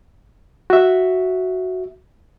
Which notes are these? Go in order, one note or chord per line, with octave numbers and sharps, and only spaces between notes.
F#4 E5